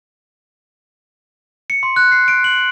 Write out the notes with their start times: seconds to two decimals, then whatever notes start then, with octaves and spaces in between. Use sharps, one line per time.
1.70 C#7
1.83 C6
1.96 F#6
2.12 C7
2.28 D7
2.44 F#7